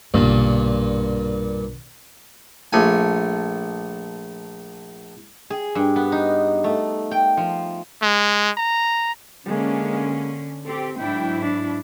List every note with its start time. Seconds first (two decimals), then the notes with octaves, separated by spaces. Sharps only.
0.14 B1 G2 A#2 D3
2.73 A#1 A3 G#5
5.50 G#4
5.75 G2
5.96 B3
6.12 D#4
6.64 A3
7.11 G5
7.37 F3
8.02 G#3
8.58 A#5
9.46 D3 G#3 A#3 C#4
10.65 C4 G4 A4
10.98 G#2 F#3 D4 E4 G5
11.42 D4